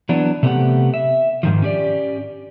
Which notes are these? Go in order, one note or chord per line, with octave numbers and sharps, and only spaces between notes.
E3 F#3 B3 D4
C3 A3 B3 E4 G4 F#5
E5
G#2 D#3 F3
C#4 G4 D5